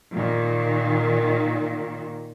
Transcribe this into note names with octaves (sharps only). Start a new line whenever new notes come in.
A#2 D#3